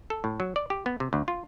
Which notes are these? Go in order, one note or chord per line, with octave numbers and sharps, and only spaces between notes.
A4
A2
F#3
D5
G4
B3
C3
D2
F4